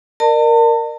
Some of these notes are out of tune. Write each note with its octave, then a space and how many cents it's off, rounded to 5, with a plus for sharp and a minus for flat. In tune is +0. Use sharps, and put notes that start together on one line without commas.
A#4 +0 D5 +40 A5 +40